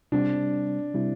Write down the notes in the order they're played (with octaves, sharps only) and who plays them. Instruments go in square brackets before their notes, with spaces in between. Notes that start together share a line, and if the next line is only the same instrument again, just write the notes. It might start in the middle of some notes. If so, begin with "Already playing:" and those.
[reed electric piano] C3 G3 C4 [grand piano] D4
[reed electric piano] C3 G3 C4 E4